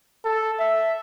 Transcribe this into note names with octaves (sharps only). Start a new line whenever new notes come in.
A4
E5